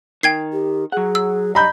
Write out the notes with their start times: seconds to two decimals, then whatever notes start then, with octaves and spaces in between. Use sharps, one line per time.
0.23 D#3 G5 G#6 C7
0.53 G4
0.92 F#3 G#4 F#5
1.15 E6
1.55 G3 D#5 A#5 B5 G6